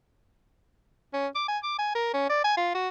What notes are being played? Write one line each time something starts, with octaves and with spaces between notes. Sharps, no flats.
C#4
D6
G#5
D6
G#5
A#4
C#4
D5
G#5
F4
F#4